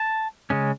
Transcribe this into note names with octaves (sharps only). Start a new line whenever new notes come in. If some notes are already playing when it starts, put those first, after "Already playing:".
Already playing: A5
C#3 G#3 C#4